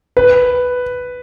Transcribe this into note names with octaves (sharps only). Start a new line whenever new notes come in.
B4